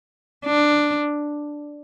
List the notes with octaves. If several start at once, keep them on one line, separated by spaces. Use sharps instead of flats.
D4